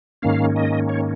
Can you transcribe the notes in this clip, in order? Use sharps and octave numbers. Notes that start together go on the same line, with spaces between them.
G#2 D#3 A#3 C#4 F5
D#5
C#5